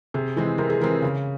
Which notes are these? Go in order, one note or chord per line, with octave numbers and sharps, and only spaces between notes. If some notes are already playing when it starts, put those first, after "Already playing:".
C3 G#4
E3 G#3 C4
C3 A#4
G#4
E3 G#3 C4 A#4
C#3